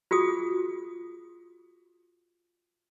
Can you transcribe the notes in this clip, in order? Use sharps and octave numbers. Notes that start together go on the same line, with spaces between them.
F4 F#4 G#4 D#6